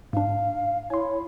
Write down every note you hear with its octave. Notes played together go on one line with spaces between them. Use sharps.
G#2 D4 F5
E4 C#5 G#5 C6